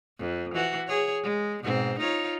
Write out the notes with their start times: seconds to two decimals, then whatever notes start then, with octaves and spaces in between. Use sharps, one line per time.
0.19 F2
0.54 E3 F#4
0.87 G#4 C#5
1.23 G#3
1.63 G#2 B2 C4
1.99 D#4 F4 C#5